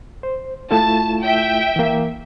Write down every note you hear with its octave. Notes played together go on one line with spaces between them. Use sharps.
C5
A3 E4 F4 A5
E5 G5
E3 A#3